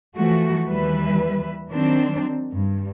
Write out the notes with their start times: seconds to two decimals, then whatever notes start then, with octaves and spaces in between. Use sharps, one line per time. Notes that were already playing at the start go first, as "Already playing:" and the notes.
0.16 E3 F3 A3 F#4
0.67 D#2 E3 G3 B4 E5
1.71 D#3 F#3 C4 D4
2.52 G2